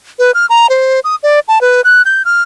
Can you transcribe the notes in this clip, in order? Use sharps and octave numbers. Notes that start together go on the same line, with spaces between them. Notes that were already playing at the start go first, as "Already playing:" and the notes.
B4
F6
A#5
C5
D#6
D5
A5
B4
F#6
G6
F6